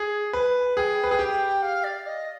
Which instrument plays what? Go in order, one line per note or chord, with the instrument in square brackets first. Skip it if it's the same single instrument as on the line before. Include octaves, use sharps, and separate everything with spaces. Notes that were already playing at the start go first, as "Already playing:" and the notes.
Already playing: [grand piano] G#4
B4
[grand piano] G#4 [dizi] G5
[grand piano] B4
G#4
G4
[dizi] F5
D5
D#5